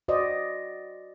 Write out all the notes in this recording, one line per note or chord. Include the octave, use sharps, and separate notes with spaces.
F#4 C5 D5 D#5